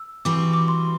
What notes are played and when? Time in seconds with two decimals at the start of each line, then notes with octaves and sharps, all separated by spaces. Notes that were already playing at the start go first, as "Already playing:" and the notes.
Already playing: E6
0.25 E3 G3 C4 F#4 D6
0.53 D6
0.68 C6